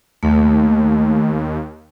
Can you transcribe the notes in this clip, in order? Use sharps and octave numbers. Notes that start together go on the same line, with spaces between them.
D#2 A3